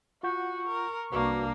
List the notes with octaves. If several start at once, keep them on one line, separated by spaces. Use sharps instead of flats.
F4 F#4 F#5 C#6 G6
A#4
C2 A#3 D4 F#4 B4